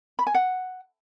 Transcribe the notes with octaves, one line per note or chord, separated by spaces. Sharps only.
B5
G#5
F#5